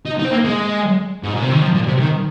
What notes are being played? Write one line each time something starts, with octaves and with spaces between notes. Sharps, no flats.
D#4
D#4
C4
A#3
G#3
G#2
A#2
C3
D#3
F3
A#2
C3
D#3